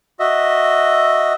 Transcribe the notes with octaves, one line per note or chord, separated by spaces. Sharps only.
F#4 D#5 E5